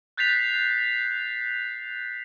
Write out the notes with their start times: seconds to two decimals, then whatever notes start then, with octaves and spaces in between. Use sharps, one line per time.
0.17 F#6 G6 A6 B6 C7 F7